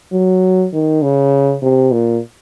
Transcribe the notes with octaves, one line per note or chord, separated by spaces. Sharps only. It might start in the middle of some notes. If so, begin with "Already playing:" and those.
F#3
D#3
C#3
C3
A#2